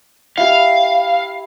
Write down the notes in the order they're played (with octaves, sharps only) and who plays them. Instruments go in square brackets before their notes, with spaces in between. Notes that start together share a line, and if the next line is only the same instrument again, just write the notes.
[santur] E4 G4 [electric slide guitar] F5